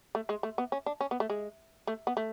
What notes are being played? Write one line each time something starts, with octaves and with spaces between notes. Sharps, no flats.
A3
G#3
A3
B3
C#4
D4
C#4
B3
A3
G#3
A3
B3
A3